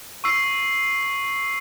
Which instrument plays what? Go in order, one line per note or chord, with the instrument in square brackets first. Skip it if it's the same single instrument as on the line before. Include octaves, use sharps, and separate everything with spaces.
[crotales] C#6 E6 C7